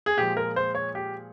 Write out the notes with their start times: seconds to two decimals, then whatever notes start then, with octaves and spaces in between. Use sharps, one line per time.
0.06 G#4
0.17 A#2 F3 G#3 G4
0.37 A#4
0.56 C5
0.75 C#5
0.95 G4